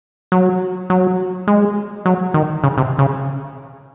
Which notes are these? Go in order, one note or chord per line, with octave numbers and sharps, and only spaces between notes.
F#3
F#3
G#3
F#3
D#3
C#3
C3
C#3